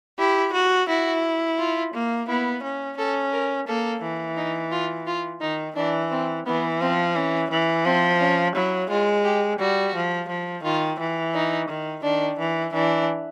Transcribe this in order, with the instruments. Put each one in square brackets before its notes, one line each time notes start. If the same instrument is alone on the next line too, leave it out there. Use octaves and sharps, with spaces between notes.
[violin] E4 [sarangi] G4
[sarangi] F#4
[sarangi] E4 [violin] F#4
[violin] F4
[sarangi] A#3
[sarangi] B3 [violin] E4
[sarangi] C#4
[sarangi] C#4 [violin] A4
[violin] A#4
[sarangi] A#3 [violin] A4
[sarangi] E3
[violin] D#4
F4
F4
[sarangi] D#3 [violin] D#4
[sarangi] E3 [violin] D4
[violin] C4
[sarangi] E3 [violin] B3
[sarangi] F3 [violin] C4
[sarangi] E3 [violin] C#4
[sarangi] E3
[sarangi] F3 [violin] C4
[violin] C#4
[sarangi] F#3 [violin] E4
[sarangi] G#3 [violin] F4
[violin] G4
[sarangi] G3 [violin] F#4
[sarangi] F3
F3
[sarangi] D#3 [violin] F4
[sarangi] E3
[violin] D#4
[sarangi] D#3
[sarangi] D#3 [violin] D4
[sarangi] E3
[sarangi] E3 [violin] D4